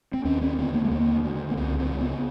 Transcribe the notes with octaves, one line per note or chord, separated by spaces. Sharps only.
C4
D#2 C#4
C4
D3 B3
A#3
A3
D#2 A#3
D3
B3
C#2 C4
C4
C#3
B3